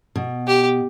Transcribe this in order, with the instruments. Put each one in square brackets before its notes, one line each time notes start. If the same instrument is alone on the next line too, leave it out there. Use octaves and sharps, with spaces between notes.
[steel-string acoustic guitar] B2
[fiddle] G4